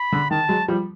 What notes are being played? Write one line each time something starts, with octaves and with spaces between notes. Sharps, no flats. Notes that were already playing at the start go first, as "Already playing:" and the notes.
Already playing: B5
D3
D#3 A5
F#3 G#3
F3 G3